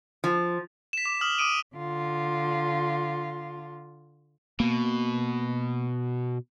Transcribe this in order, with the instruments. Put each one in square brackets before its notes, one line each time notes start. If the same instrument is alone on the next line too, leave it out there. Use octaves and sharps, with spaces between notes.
[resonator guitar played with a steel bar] F3
[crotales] B6 E7
D6
D#6 F6 F#7
D6 D#6 D7 D#7
[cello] D3 F4
[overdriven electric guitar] B2 [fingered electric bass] A#3